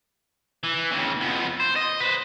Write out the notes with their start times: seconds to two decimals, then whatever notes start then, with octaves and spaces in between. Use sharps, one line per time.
0.64 E3
0.91 D#2 C#3
1.21 F2 B3
1.60 C5
1.76 D#5
2.00 B4 C5